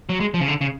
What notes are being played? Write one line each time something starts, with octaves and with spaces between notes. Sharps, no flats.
F#3
G#3
F3
C#3
D3
C#3